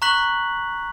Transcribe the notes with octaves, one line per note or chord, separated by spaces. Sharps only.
A#5 C#6 F#6 B6 F#7